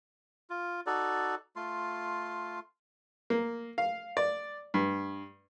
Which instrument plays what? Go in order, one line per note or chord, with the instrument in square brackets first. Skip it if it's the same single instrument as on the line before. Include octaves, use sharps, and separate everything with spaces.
[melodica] F4
D#4 F#4 A4 D5
A3 F4 C6
[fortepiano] A#3
F5
D5
G2